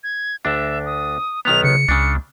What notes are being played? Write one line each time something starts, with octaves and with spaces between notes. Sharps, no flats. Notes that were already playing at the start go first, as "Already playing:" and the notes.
G#6
D2 D4 E5
D#6
B1 D#3 B3 F7
C#3 C#7
C#2 C#3 D4